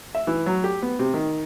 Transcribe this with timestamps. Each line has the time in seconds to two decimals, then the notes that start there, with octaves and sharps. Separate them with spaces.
0.15 E5
0.27 E3
0.46 F#3
0.64 G4
0.82 B3
0.99 C3
1.14 D#3